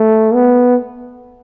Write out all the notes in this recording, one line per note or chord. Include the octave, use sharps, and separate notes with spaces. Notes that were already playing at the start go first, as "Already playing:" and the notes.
Already playing: A3
B3